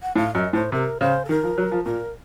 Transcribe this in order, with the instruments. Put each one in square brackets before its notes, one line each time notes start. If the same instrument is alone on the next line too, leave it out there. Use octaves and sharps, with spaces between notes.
[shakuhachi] F#5
[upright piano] A2 [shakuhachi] F5
[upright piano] F#2 [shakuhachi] D#5
[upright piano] A2 [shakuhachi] C5
[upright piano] C3 [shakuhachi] A#4
[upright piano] C#3 [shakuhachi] C5
[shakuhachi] A4
[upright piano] D#3 [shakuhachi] A#4
[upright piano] F3
F#3
F3
[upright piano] A#2 [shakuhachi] A#4